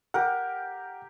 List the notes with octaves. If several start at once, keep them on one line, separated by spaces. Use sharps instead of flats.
G4 A#4 F#5